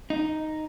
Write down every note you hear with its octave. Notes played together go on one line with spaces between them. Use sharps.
D#4